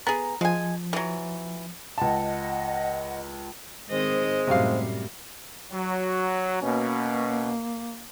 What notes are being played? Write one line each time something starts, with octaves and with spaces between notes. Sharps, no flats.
B3 G#4 A#5
F3 G#3 G#5
E3 F#3
C#2 D#5 F#5 A5
G#2 D#3 G#3 C4 C5 D#5
F#2 A2 C3 G3 F5
F#3
B2 A#3 C#4